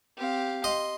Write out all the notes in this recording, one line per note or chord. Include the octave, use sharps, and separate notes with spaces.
C4 G4 F5
D#5 C6